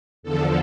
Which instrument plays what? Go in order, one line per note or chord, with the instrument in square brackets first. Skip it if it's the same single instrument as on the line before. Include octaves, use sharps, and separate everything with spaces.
[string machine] E2 D3 F3 A4